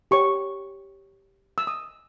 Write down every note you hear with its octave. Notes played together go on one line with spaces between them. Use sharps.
G4 C#5 C#6
E6
D#6